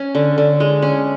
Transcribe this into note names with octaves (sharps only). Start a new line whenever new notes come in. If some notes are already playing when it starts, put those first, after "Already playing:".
Already playing: C#4
D3
D3
G#3
C#4